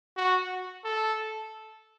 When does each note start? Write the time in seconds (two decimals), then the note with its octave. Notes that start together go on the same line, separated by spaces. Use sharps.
0.17 F#4
0.85 A4